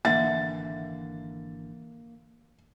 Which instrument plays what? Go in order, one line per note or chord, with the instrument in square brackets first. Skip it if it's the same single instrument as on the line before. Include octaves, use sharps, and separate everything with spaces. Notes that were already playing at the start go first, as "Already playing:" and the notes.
[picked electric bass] G#1 D3 E3 [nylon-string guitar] A#3 E5 F#5 [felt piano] A6